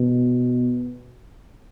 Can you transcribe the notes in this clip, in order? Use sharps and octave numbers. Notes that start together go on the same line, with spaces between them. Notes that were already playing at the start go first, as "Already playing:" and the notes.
Already playing: B2